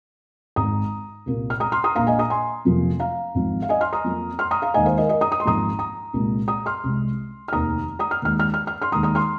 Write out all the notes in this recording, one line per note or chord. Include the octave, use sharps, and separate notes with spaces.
G#1 G#2 G#3 A#5 D#6
C2 A#2 A#3
F6
A#5 D#6
C6 F6
A#5 D#6
A#1 A#2 A#3 F5 A#5
D#5 G#5
A#5 D#6
G#5 C6
F1 F2 C3 F3 A#3
F5 A#5
G#1 G#2 F3
F5
D#5 G#5
C6 F6
A#5 D#6
F2 F3 A#3
C6 F6
A#5 D#6
F5 A#5
D#2 D#3 G#3 D#5 G#5
C5 F5
A#4 D#5
A#4 D#5
A#5 D#6
D#6
C6
G#1 G#2 F3 A#3 A#5 D#6
A#5 D#6
C2 A#2 G#3
A#5 D#6
C6 F6
C2 C3 G#3
F6
F1 D#2 D#3 A#5 D#6
A#5 D#6
F6
D#2 D#3 G#3 F6
F6
F6
F6
C6 F6
D#2 D#3 G#3 A#5 D#6
A#5 D#6
C6 F6